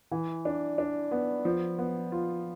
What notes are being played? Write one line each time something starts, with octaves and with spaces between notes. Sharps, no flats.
E3
D4
D4
B3
F3
B3
F4